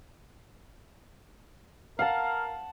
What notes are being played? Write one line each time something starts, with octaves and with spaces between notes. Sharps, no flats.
A#4 F5 F#5 A5